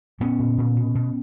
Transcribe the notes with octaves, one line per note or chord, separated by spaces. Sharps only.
A#2 B3 C#4
A#2
A#2
B2
B2